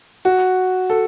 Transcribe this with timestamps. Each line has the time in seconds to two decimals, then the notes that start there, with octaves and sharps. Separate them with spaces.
0.25 F#4
0.90 A4